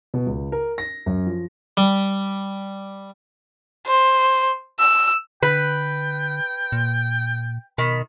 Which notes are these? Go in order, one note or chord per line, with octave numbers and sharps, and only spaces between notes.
B2
C#2
A#4
A#6
F#2
F3
G3
C5
E6
D3 B4 G5
A#2
B2 D#3 B5